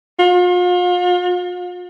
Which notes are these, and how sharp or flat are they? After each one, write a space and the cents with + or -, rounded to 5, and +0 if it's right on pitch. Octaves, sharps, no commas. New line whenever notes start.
F4 +40